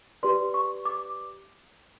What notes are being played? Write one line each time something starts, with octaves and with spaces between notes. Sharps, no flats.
G4 B4 D5 C6
C#6
D6